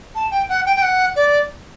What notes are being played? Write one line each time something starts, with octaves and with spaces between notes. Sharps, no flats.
A5
G5
F#5
G5
G5
F#5
D5